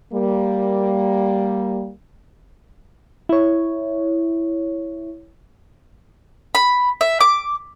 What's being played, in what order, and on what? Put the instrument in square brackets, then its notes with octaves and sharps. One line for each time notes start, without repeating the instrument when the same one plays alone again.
[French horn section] G3 A#3
[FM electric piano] E4 C#5
[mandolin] B5
E5
D6